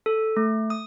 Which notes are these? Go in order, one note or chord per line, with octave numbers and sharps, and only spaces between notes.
A4
A3
D#6